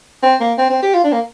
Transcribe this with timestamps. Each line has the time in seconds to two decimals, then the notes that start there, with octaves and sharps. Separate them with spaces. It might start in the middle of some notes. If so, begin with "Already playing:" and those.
0.23 C4
0.40 A#3
0.58 C4
0.70 C4
0.83 G4
0.94 F4
1.04 D4
1.12 A#3